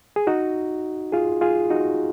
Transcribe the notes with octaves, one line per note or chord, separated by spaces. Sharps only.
G#4
D#4 F#4
F4 G#4
F4 G#4
D#4 F#4